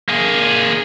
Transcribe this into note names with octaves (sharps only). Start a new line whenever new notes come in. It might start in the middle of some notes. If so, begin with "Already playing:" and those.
A#3 G#4